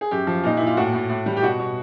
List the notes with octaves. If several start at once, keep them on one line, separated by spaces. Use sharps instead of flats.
G#4
F#2 G4
F3
A#2 D#4
A#2 E4
F4
A2 F#4
A2
A2
G3
G4
B2 F#4
B2